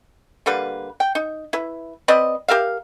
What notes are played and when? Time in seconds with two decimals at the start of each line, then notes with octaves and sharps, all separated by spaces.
0.46 D3 G3 A#3 B4
1.00 G5
1.15 D#4
1.53 E4 B4
2.08 C4 B4 D5 D#5
2.48 G4 A#4 E5 F5